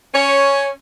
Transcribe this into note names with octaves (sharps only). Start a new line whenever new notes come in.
C#4 C#5